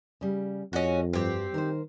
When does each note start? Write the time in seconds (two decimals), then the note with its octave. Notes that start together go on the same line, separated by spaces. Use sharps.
0.21 C#3 G3
0.73 F2 C#4 F#4 G#4 D#5
1.13 G2 C4 F#4 G4
1.54 D#3 A#4 C5